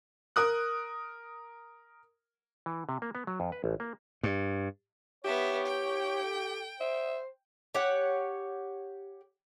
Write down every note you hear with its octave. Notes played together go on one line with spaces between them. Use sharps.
A#4 D#6 F#6
E3
C3
A#3
B3
F#3
F2
B4
A1
A#3
G2
B3 G4 C#5 E5
G5
A4
C5 E5
G4 C#5 F#5